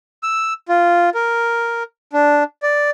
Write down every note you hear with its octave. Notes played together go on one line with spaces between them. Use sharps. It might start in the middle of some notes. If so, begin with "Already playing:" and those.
E6
F4
A#4
D4
D5